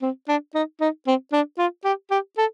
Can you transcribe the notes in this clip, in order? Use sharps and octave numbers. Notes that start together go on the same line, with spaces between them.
C4
D4
D#4
D#4
C4
D4
F4
G4
G4
A4